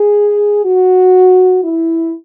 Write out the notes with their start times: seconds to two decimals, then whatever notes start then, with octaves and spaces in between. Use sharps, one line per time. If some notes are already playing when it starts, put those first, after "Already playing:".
Already playing: G#4
0.65 F#4
1.62 E4